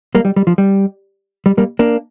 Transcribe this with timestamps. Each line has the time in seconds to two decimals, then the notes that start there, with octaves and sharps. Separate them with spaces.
0.15 G3 A#3
0.25 G3
0.36 G3
0.47 F3
0.58 G3
1.46 G3
1.58 G3 A#3
1.79 A#3 D4